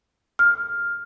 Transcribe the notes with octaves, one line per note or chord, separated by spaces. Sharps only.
F6